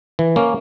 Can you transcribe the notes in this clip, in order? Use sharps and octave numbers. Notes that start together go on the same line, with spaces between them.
E3
A#3 C#4